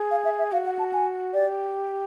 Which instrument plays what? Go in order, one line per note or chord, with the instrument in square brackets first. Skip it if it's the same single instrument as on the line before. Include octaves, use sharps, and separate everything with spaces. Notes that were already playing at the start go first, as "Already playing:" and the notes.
Already playing: [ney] G#4
[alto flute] F5
E5
E5
[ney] F#4 [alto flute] F5
[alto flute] F#5
A5
G#5
[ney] G4 [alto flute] D5